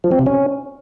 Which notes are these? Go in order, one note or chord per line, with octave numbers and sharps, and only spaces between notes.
F3
C4
C3
C#4